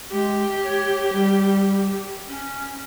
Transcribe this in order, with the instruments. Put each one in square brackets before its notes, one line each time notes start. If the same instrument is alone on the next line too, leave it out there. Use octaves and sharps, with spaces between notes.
[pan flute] G#3 [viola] G4
[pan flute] C#5
G3
C#4